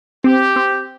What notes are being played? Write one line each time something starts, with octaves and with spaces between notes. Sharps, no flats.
C4 G4
C4